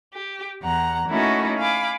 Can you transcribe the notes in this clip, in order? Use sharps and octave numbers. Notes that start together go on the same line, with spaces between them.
G4
E2 F#5 A#5
A3 A#3 C#4 D#4 E4 F#4
F5 G#5 B5 D6